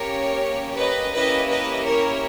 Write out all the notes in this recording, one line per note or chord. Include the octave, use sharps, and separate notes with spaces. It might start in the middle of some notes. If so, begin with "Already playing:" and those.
Already playing: A#3 C#4 G4 A#4 C#5
B4 D#5
A#3 C#4 E4 G4 B4 D#5
B4 D#5
A#4 C#5